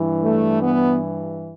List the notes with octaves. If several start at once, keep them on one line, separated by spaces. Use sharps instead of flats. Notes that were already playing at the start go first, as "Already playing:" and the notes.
Already playing: G2 E3
A3
B3